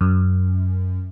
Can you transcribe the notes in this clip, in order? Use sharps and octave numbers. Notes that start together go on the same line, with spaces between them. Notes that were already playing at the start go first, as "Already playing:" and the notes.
F#2